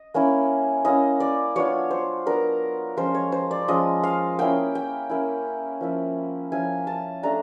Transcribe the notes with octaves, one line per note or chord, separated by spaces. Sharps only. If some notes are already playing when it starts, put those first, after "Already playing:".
Already playing: D#5
A#3 C#4 E4
A#3 C#4 E4 D#5
D5
F#3 B3 D4 F4 C#5
C5
F#3 B3 D4 F4 A#4
F3 G#3 C#4 F4 C5
C#5
C5
D5
F3 G#3 C#4 F4 D#5
F5
A#3 C#4 E4 G5
G5
A#3 C#4 E4
F3 A#3 C#4 E4
F3 A#3 C#4 E4 G#5
A5
A3 D4 A#5